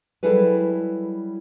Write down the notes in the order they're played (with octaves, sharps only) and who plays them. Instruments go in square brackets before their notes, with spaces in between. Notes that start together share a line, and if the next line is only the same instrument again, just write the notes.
[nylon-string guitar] F#3 G3 E4 G#4 A4 B4